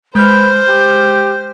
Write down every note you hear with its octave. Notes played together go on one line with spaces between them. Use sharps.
G#3 B4 C5 F6 G6
G4